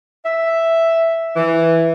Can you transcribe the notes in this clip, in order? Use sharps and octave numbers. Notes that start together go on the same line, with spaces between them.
E5
E3